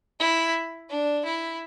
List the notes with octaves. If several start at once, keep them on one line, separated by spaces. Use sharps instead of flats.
E4
D4
E4